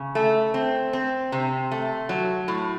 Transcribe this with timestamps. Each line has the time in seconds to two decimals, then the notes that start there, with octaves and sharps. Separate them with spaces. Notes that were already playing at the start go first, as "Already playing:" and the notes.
Already playing: C#3
0.15 A3
0.54 C4
0.93 C4
1.32 C3
1.72 A3
2.09 F#3
2.48 A2